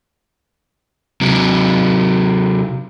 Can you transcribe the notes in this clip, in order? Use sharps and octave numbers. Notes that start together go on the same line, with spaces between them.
C3 F#3